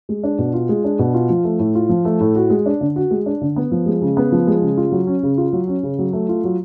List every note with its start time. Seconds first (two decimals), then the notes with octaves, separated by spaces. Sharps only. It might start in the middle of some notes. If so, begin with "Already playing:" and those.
0.09 G#3
0.24 D4
0.39 B2
0.54 F4
0.69 G#3
0.84 D4
0.99 B2
1.14 F4
1.30 F3
1.44 A3
1.59 A2
1.75 F4
1.89 F3
2.05 A3
2.20 A2
2.35 F#4
2.50 G#3
2.66 D4
2.81 D3
2.96 F#4
3.11 G#3
3.26 D4
3.41 D3
3.56 B3
3.72 F3
3.86 G#3
4.01 C#3
4.17 B3
4.32 F3
4.47 G#3
4.62 C#3
4.77 F4
4.92 F#3
5.07 C#4
5.23 C#3
5.38 F4
5.53 F#3
5.68 C#4
5.83 C#3
5.99 F#3
6.13 A3
6.29 F4
6.44 F#3